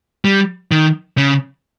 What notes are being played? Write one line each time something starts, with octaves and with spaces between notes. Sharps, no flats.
G3
D#3
C#3